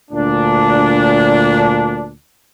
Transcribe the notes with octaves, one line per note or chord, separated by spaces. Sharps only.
D2 A#2 D4